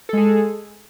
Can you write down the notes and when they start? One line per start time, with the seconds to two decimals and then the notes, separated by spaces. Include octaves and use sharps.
0.09 A4
0.13 G#3
0.17 G#4